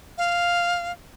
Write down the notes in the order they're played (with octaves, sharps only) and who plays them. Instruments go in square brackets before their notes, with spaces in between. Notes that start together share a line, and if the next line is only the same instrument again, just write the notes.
[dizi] F5